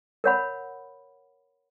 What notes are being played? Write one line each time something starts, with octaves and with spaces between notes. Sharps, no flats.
A#4 C#5 F#5 B5